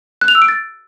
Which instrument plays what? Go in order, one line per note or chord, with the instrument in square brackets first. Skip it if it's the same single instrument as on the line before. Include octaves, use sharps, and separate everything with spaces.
[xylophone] F#6
F7
E6
D7
A6